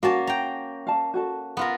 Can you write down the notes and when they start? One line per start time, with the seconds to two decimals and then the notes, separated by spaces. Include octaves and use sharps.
0.03 A#3 C#4 F#4 A5
0.27 G5 A#5
0.87 F5 A5
1.14 F#4 A4 A5
1.57 B3 F4 A#4